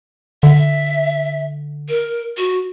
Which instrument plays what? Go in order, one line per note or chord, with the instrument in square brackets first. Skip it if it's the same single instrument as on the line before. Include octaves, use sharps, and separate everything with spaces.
[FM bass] D3 [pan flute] E5
[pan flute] A#4
F#4